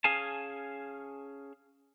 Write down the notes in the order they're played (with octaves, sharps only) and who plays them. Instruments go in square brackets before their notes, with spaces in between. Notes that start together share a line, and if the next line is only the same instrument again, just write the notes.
[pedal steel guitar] C#4 G#4 F5 G#5 A5